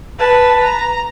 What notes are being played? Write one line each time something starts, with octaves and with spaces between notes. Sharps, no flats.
B4 A5
A#5